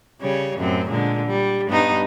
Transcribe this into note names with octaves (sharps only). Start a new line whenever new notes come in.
C#3 G3 C#5
F#2 A2 C4
A#2 D3 G#3
G3
G2 B3 D#4